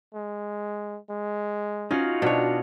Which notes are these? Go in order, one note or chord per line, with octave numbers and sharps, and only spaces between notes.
G#3
G#3
C#4 D#4 F4 F#4
B2 D4 C#5